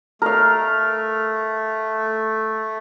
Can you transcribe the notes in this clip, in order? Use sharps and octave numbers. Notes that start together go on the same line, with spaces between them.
A3 A#4 F5